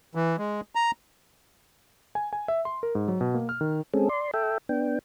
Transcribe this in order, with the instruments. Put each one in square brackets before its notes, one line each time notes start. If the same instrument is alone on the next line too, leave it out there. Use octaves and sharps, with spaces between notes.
[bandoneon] E3
G#3
A#5
[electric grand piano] G#5
G#5
E5
C6
A#4
G#2
F#3
B2
A#3
F6
D#3
[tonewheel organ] G#3 C4 C#4 G#4 A4
D5 C6
A4 E5 G5
B3 D4 G5